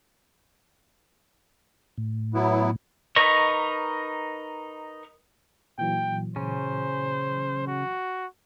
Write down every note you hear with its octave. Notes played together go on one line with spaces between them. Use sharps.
A2
F#3 B3 E4
D#4 A#4 B4 D#5 C#6
A#2 E3 F#3 G5
C#3 C#4 C5
F#4